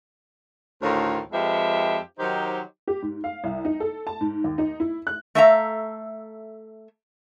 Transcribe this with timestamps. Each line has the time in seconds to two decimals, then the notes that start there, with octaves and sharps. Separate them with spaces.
0.82 D2 A2 D#3 F4 C5 C#5
1.33 F2 F3 G#3 G4 B4 E5
2.19 D#3 F#3 D#4 G4 C5
2.87 G4
3.02 G#2
3.24 F5
3.44 C2
3.65 D#4
3.80 A4
4.07 A5
4.21 G#2
4.44 D#2
4.58 D#4
4.80 E4
5.07 F#6
5.35 A3 A4 E5 F5 G#5 A#5